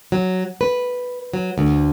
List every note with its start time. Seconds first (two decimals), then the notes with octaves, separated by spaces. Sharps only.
0.12 F#3
0.61 B4
1.34 F#3
1.58 D2